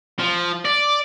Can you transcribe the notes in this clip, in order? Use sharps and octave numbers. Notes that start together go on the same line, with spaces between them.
F3
D5